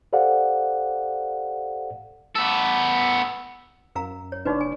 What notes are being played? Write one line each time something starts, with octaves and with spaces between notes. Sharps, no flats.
G4 A4 C5 D5 F5 F#5
B3 A4
F#2 A#4 F5 A#5
C#5
F#1 D4 D#4 F#4 B4 C#5 D5
G#5